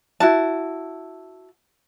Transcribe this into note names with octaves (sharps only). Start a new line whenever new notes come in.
E4 F#4 A5